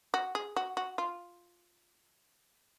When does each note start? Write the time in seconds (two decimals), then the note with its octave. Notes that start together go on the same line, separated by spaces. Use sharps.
0.14 F#4
0.35 G#4
0.56 F#4
0.77 F#4
0.98 F4